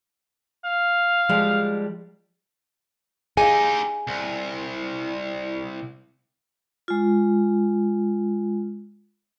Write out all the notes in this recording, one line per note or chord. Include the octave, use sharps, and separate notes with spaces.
F5
F3 G3 G#3
D#4 G4 G#4 D#5 F5 G#5
C2
G#3 F4